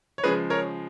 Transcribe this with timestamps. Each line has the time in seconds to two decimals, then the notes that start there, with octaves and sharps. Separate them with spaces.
0.18 C#5
0.24 C#3 F3 G#3 G#4 B4
0.50 A#4 C#5